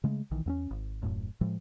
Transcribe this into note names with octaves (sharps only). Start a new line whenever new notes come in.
C#3 G#3 A3
A#1 D#3 E3
E2 B3 C#4
G#1
D#1 F#2 A2
A2 F3 G#3